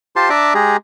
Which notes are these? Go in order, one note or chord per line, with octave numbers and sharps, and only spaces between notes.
F4 G4 C5 A5 C6
D4 D5 E5 A5 A#5 D6
G#3 G4 G#4 A#5